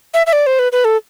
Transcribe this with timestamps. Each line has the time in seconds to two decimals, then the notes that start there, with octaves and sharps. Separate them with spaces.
0.14 E5
0.26 E5
0.33 D5
0.46 C5
0.59 B4
0.72 B4
0.84 A4